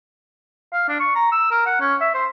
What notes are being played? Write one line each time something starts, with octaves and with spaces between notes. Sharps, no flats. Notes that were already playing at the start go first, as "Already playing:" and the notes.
F5
D4
C#6
A#5
E6
A#4
F#5
C#4
E5
C5